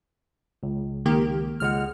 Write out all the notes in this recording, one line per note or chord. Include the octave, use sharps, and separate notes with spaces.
C#2
D#3 A#3 G4
C#2 G#3 F#5 F6